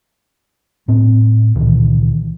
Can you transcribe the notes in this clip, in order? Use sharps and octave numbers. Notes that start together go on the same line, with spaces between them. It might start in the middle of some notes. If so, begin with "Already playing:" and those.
A2 C4
C#2 A#2 D#3 E3